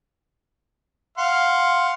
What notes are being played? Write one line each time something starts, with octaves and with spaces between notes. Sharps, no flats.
F5 F#5 C6